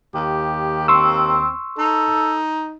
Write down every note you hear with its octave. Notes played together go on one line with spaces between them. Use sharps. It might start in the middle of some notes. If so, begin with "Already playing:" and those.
D#2 G4
C4 C6 C#6 E6
D#4 A4